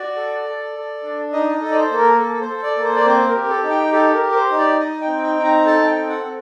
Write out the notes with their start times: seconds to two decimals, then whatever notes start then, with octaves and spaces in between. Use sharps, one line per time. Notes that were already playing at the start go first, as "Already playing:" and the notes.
Already playing: F#4 D5
0.16 A4
0.46 A4
0.75 A4
1.03 D4
1.33 D#4 D#5
1.54 D#5
1.61 A4
1.71 D5
1.75 C5
1.91 A#3
1.97 A#4
2.19 A4
2.41 C5
2.48 A4
2.63 D5
2.77 A#3
2.84 C5
2.96 D5
3.05 C4 C5
3.28 A#4
3.35 G4
3.49 A4
3.63 D#4
3.70 G5
3.92 G4 A4
4.14 A#4
4.22 G4
4.31 A#4
4.35 C5
4.50 D#4
4.58 D5
4.80 D#4 D#5
5.01 G5
5.07 C4
5.23 G5
5.37 D#4
5.44 A#5
5.65 A4 A5
5.87 G5
5.95 C4
6.09 F#5
6.24 C4